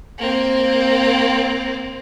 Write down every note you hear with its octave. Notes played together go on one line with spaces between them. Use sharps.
A#3 C4